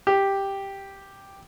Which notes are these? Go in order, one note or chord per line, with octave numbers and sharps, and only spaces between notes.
G4